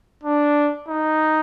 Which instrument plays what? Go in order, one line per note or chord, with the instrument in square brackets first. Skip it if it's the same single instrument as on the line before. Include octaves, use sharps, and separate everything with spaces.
[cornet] D4
D#4